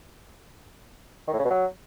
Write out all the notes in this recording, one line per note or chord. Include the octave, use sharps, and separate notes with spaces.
D#3
A2
C#3
B2
F#3